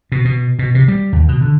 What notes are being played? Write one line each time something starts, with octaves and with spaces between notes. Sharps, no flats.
B2
B2
B2
C3
G3
D#2
B2
D3